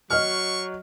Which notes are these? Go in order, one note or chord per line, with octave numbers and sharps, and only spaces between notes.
F#3 D#5 C#6 F6